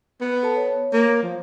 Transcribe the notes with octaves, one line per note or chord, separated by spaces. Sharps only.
B3
A4 A5
C#5
A#3
F3